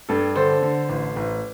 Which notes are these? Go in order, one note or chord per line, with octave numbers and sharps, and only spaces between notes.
G2 A4
D3 A4 C5
D3
A1
A1